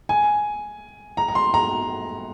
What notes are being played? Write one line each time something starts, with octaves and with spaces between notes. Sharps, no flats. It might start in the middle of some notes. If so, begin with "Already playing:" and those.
G#5
A#5
A#5
C6
A#5